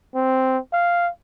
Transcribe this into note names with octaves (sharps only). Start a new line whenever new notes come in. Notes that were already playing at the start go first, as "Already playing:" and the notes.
C4
F5